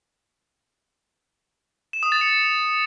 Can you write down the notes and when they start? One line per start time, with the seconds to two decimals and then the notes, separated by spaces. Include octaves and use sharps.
1.93 E7
2.03 D#6
2.12 A6
2.21 C#7